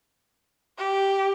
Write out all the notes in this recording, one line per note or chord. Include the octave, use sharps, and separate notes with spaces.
G4